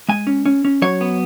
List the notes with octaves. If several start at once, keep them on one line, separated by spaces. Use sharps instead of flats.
G#3 G#5
C#4
C#4
C#4
F#3 C#5
B3